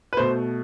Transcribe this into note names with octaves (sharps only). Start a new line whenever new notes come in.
B4
B2 A3 C5